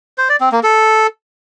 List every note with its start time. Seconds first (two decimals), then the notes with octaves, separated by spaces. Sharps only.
0.18 C5
0.29 D5
0.41 C4
0.52 A#3
0.63 A4